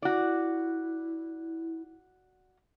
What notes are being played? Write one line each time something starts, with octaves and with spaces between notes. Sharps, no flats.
E4 F#4 D5